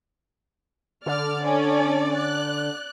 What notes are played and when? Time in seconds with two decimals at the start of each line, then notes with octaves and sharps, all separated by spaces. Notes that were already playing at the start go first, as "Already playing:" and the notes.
1.06 D3 D5 F6
1.44 C#4 A4
2.14 F#6